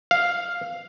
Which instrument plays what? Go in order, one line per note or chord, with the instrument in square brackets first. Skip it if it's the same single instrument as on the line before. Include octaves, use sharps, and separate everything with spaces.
[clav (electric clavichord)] F5